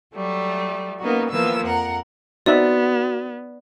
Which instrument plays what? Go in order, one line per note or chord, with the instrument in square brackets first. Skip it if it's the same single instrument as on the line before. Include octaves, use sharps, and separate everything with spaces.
[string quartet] F#3 G3 A3
A#3 B3 C#4 D#4 F#4
E3 F3 A#3 B3 E6
F2 A#4 F#5
[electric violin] B3 [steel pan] C4 D#4 E5 [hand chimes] F#4 [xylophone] D5